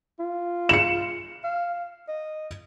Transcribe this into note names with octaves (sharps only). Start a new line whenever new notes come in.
F4
C#7 E7
F5
D#5